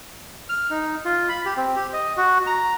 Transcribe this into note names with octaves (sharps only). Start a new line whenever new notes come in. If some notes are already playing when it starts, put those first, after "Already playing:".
F6
D#4
F4
B5
G4
C4
G4
D#5
F#4
A#5